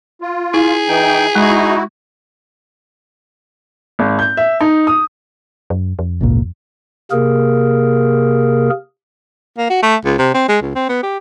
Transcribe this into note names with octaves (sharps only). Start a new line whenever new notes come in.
F4
E4 G#4
E3 D#4 G5
G#3 D#4 E4 F#4
G#1
G6
E5
D#4
D#6
F#2
F2
G#1 C#2 A#2
C3 A#3 G#4 A#4
A#3
F#4
A3
C#2
C3
C4
G#3
C#2
C4
B3
G4